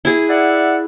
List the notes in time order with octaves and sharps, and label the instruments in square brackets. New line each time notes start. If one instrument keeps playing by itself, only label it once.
[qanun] E4 G#4
[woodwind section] D5 E5 F#5